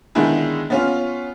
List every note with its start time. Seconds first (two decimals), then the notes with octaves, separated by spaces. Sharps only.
0.15 D3 D#3 G#3 B3 E4 G#4
0.70 B3 C#4 F4